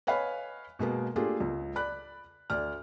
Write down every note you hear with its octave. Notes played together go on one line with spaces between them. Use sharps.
B4 C#5 D#5 F5 G#5 B5
B2 G#3 A#3 B3
A3 A#3 D4 F4 G4 G#4
C#2
D5 B5 F#6
D2 D5 F6